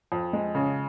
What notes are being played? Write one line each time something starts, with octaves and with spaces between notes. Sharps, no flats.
F2
G#3
C#3